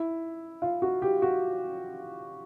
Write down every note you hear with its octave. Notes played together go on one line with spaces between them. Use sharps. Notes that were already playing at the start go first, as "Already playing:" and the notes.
Already playing: E4
F4
F#4
G4
F#4